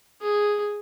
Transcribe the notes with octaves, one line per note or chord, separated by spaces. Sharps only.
G#4